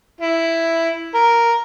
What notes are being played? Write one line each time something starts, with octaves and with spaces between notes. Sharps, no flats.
E4
A#4